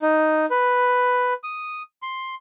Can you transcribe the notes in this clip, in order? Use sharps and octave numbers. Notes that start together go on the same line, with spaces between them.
D#4
B4
D#6
C6